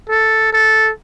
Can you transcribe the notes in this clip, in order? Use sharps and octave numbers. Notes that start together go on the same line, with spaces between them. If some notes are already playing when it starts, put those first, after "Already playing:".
A4
A4